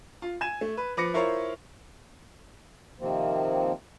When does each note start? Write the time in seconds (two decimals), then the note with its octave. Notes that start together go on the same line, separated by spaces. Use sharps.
0.22 F4
0.41 G#5 G#6 E7
0.61 A3
0.77 B4
0.97 F3 B4 D6 A#6 C#7
1.14 E4 F4 A#4 C5 C#5
3.00 C3 D#3 F3 A#3 C4